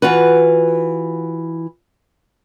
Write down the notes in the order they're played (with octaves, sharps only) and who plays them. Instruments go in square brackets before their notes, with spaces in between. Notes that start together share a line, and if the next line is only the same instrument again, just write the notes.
[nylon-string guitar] E3 F4 F#4 B4